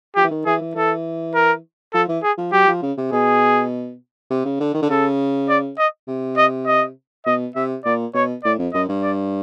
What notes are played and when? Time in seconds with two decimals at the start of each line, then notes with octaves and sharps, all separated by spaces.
0.16 F3 G4
0.23 E3
0.31 D#3
0.46 E3 G#4
0.61 E3
0.76 E3 A4
1.35 A#4
1.94 F3 A4
2.08 E3
2.23 G#4
2.37 F3
2.53 F#3 G4
2.68 F3
2.82 C#3
2.97 C3
3.12 B2 G#4
4.30 C3
4.45 C#3
4.60 D3
4.74 D#3
4.82 D3
4.89 C#3 A4
5.49 D5
5.78 D#5
6.08 C3
6.37 D#5
6.67 D#5
7.26 B2 D#5
7.56 C3 E5
7.85 A#2 D5
8.14 B2 C#5
8.44 A2 D5
8.58 F2
8.74 F#2 D#5
8.89 G2
9.03 D5